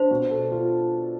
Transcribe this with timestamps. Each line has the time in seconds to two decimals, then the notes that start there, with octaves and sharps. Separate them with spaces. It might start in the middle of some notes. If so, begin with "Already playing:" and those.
Already playing: D4 C5
0.11 B2
0.31 A4
0.52 F4